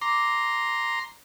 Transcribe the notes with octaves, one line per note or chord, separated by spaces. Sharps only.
A#5 C6 D6